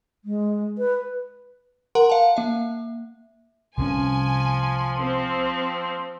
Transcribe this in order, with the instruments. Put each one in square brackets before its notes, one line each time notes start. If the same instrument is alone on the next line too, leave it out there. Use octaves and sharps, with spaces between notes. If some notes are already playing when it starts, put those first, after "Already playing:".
[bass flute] G#3
B4
[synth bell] A#4 F#5 A#5 C6
F5 A5
A#3 E5
[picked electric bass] C2 C3 C#4 [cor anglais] F3 [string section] G#5
[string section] C4